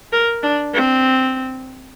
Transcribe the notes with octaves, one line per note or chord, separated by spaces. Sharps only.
A#4
D4
C4